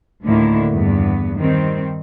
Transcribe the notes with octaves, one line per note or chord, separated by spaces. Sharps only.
D2 A2 D3 D#3 A#3 E4
E2 G2 B3
D#3 G3 C4